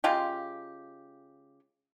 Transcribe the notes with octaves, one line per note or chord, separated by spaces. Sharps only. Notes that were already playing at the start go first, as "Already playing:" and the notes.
C#3 G#3 F4 G4